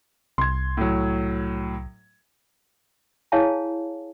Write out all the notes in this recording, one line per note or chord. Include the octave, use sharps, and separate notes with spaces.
C2 C6 G#6
A2 F#3
E4 G#4 C#5 F5 G#5 A5